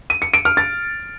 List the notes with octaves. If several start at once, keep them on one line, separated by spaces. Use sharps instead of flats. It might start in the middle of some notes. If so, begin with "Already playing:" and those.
D#7
C#7
D7
F6
A6